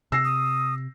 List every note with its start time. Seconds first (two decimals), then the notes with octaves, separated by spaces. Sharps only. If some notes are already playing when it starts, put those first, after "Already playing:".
0.12 C3 E6 A#6 C7
0.25 D#6